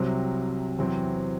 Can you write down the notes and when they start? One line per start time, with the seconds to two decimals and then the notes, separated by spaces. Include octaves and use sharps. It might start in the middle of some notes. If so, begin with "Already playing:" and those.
Already playing: C2 C3 F#3 C4
0.79 E2 C3 F#3 C4